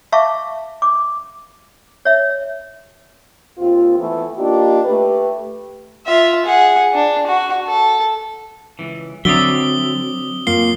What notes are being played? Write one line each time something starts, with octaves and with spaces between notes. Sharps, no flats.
E5 F5 A5 C#6 D6
D6
C#5 E5
D#2 C4 F4
E3 A3 B3
A#3 D4 D#4 F4 G4
A3 G4 B4
F4 E5
G#4 F#5
D4
F#4
A4
C#2 E3
D3 F#3 C4 D5 E5 D#6 G7
F#2 A#3 F4 C7 G7